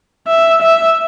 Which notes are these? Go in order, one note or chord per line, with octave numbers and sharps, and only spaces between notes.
E5
E5